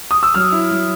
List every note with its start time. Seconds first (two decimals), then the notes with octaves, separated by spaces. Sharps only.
0.11 D#6
0.23 E6
0.34 F#3 F6
0.52 E4
0.71 F#3